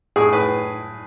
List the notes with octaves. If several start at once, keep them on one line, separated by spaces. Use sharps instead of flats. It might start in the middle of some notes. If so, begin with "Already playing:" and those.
A2 G#4
A2 B4